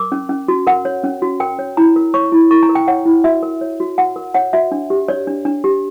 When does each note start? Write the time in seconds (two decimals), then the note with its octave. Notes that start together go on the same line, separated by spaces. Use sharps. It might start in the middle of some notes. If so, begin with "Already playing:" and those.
Already playing: A#4 D6
0.12 C#4
0.29 C#4
0.48 F#4
0.67 A#4 F#5
0.85 C#5
1.04 C#4
1.22 F#4
1.40 A#4 G5
1.59 C#5
1.77 E4 A#5
1.96 A#4
2.14 C#5 C#6
2.32 E4
2.51 E4 C#6
2.63 A#5
2.69 A#4
2.75 G5
2.88 C#5 F#5
3.06 E4
3.24 F#4 E5
3.43 A#4
3.61 C#5
3.80 F#4
3.98 F#4 F#5
4.16 A#4
4.34 C#5 F#5
4.53 F#4 E5
4.72 D4
4.90 G4
5.08 C#5 D5
5.27 D4
5.45 D4
5.64 G4